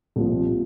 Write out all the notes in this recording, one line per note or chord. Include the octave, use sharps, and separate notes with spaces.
C2 A#2 F3